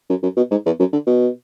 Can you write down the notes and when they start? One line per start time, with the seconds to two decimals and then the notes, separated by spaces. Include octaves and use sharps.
0.10 F#2
0.23 F#2
0.36 B2
0.51 G#2
0.65 E2
0.79 F#2
0.93 D3
1.07 B2